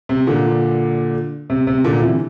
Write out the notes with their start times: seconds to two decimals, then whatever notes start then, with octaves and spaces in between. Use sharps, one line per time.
0.09 C3
0.27 A#2 D3
1.50 C3
1.67 C3
1.84 A#2 D3
2.02 C3 E3